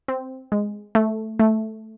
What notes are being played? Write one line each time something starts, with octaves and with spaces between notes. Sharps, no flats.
C4
G#3
A3
A3